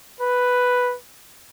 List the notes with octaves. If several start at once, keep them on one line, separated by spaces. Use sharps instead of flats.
B4